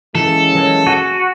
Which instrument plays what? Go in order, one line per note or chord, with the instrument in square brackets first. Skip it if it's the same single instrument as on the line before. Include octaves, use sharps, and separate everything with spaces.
[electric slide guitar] E3 [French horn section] G#3 A#3 C#4 [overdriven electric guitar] A4
[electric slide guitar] E3 F#3 C#5
[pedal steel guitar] F#4 [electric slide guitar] G#5